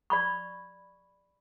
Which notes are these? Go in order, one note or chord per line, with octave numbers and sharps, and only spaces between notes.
D5 B5 C#6